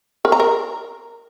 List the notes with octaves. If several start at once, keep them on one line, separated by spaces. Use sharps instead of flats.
A#4
A#5
A#4